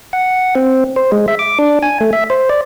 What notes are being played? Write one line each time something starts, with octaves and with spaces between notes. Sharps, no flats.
F#5
C4
C5
G#3
E5
D6
D4
G#5
A3
E5
C5
D5